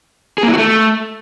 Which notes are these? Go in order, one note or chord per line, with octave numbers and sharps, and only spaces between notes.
G#4
A#3
E4
F#4
A3